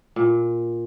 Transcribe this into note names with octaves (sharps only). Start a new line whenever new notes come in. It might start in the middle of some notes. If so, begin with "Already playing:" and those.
A#2